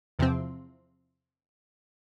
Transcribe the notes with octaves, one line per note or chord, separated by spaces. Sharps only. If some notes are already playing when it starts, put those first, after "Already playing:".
E2 C3 F3 C4